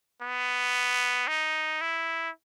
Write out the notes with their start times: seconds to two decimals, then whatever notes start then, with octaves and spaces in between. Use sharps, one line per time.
0.22 B3
1.28 D#4
1.81 E4